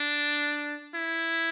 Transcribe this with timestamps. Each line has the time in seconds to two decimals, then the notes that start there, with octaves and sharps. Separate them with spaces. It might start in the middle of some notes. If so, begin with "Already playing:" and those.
Already playing: D4
0.95 E4